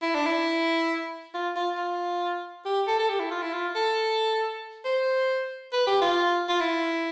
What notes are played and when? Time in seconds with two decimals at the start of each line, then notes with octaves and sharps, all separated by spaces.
0.02 E4
0.15 D4
0.26 E4
1.34 F4
1.56 F4
1.77 F4
2.65 G4
2.87 A4
2.99 A4
3.09 G4
3.19 E4
3.31 F4
3.42 E4
3.53 F4
3.75 A4
4.85 C5
5.73 B4
5.87 G4
6.01 F4
6.49 F4
6.60 E4